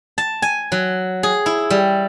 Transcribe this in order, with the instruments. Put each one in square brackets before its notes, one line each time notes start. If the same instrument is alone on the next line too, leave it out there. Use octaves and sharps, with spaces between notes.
[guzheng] A5
G#5
F#3
G#4
E4
G3